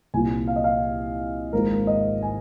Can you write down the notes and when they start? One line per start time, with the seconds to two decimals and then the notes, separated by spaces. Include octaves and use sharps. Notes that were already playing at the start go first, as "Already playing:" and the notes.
0.14 C2 A#2 F3 A#3 G#5
0.48 F5
0.56 D#5
0.64 F5
1.53 G#1 G#2 F3 A#3 A#4
1.87 D#5
2.22 G#5